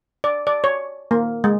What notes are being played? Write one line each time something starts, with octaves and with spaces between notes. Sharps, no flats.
D5
D5
C#5
A#3
G#3